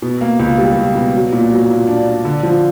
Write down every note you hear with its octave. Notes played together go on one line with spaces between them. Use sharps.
B2
A#3
C#2
G3
C#2
B2
F#3
A#2
F#3
A#2
D4
D4
D3
F3